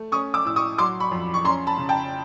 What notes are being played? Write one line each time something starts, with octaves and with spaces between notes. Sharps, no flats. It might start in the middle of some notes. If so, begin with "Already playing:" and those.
Already playing: A3
C#4 C#6 D#6
D6 E6
A2 E6
C#6 D#6
F#3 C6 D6
B5 C#6
F2
C#6
C#4 A#5 C6
A5 B5
C#3
G5 A5